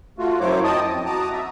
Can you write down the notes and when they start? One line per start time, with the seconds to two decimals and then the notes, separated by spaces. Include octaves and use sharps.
0.18 A3 F4 F#4
0.40 F#2 F#3 E4 C5 C#5 D6
0.64 D#5 G5 A5 D#6
0.90 F2
1.06 F#4 A5 A#5 D6 D#6
1.32 E5